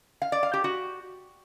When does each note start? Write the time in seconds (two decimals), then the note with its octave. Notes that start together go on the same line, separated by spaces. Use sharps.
0.22 F5
0.32 D5
0.43 F5
0.53 G4
0.64 F#4